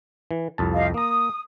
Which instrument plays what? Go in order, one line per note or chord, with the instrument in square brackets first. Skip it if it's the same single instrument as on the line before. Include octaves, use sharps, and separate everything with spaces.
[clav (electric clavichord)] E3
C2 F2 A5
[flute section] G4 D#5 F5
[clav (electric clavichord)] A#3 A#5 [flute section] D#6